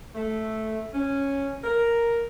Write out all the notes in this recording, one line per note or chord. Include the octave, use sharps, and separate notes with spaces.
A3
C#4
A#4